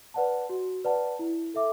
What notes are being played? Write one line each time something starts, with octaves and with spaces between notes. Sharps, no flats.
B4 D5 F#5 A5
F#4
B4 D5 F#5 A5
E4
A4 E5 D6